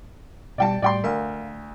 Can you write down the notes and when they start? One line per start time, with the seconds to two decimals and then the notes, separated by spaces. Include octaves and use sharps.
0.58 B2 G3 D5 G5 A5
0.82 A2 G3 D5 G5 C6
1.04 D2 A#4 F5